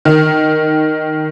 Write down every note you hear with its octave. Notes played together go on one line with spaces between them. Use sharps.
D#3